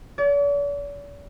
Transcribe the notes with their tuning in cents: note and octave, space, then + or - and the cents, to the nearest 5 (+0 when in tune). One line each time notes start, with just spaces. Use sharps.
D5 -45